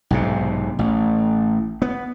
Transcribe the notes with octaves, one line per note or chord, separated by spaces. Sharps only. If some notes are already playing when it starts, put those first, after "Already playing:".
B1 G#2 C3
A1
B3